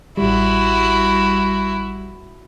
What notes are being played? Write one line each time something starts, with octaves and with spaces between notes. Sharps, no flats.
A1 G3 E4 F#4